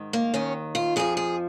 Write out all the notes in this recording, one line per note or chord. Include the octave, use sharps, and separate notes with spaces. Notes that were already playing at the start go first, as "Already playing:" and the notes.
Already playing: G#2 D#3
A#3
D#2 D#3 C#4
F4
F2 F3 G#4
G#4